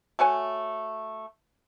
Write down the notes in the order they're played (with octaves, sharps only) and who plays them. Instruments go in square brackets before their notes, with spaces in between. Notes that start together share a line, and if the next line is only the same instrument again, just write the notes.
[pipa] A3 F#4 C#5 G#5